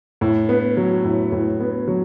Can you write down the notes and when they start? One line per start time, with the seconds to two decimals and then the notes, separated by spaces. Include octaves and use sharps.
0.21 A2
0.49 B3
0.77 F#3
1.04 A2
1.32 A2
1.60 B3
1.88 F#3